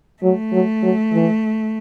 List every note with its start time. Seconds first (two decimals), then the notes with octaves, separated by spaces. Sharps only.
0.23 F#3 A3
0.53 F#3
0.82 F#3
1.13 E3